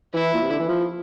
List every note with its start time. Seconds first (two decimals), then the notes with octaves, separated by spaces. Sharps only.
0.14 E3 E4
0.34 A#2
0.42 C3
0.51 D3
0.59 E3
0.68 F3